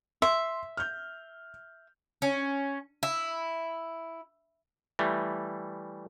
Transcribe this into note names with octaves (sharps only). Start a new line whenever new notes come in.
E5 C6
F6 G6
C#4
E4
E3 G3 A3